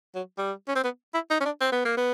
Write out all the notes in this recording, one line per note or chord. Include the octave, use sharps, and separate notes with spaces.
F#3
G3
C#4
C4
B3
E4
D#4
C#4
D4
C4
B3
A#3
B3